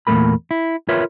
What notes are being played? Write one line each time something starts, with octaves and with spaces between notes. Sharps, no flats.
E2 A#2 E3 A3 A#4 B5
E4
F4 A#4 B4 C#5 E5